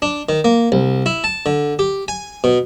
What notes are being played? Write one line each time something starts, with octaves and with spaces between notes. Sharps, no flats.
D4
D#3
A#3
C2
E4
A5
D3
G4
G#5
B2